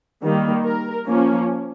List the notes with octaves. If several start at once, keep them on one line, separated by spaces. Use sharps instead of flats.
D#3 G3 A#3
A#4
F3 A#3 C#4